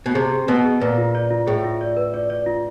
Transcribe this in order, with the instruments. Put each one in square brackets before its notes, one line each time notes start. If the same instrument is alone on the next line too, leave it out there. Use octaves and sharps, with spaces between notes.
[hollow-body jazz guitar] B2
[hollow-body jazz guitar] C3 [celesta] G#4
[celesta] G#4
[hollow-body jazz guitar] B2 [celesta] B4
[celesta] G#4
[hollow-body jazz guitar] A#2 [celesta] B4
[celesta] F4
D5
F4
[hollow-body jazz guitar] A2 [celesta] G#4
[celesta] F4
D5
B4
D5
D5
F4